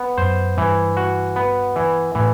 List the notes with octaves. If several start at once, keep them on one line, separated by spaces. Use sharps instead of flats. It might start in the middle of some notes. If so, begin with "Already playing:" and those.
Already playing: B3
F#2 C5
G2 E3
F#4
B3
E3
A2 E3